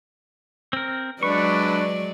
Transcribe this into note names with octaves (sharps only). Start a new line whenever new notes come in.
C4 A#4
F#3 G#3 D4 B4 D5 C#6